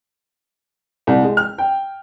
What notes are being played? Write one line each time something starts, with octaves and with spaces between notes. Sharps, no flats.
C2
G#3
F6
G5